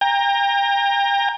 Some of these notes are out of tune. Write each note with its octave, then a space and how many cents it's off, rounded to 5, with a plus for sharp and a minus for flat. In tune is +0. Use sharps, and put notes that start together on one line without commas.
G5 +35 A#5 +0